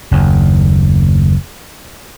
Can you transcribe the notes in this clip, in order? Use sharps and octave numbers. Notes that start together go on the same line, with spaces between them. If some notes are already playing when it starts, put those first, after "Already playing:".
F#1 D#2